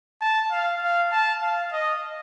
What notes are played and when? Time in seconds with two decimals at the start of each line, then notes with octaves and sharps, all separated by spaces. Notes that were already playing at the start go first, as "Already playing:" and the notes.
0.21 A5
0.51 F5
0.82 F5
1.12 A5
1.42 F5
1.72 D#5